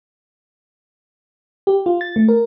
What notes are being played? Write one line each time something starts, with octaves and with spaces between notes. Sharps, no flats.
G4
F4
A6
A3
A#4